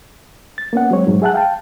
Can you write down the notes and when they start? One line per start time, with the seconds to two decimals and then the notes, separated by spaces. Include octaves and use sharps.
0.58 A6
0.73 A#3 B3 C#4 F#5
0.91 F#3 G#3 C4 C#5
1.07 F2 G#2 B2 F#3
1.22 G#4 E5 F#5 A5 F#6
1.34 F5 G5 A5